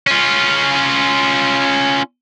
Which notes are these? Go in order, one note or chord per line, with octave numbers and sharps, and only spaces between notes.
C#4 F4